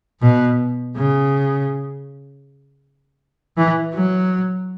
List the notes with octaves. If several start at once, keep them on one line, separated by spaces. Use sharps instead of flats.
B2
C#3
E3
F#3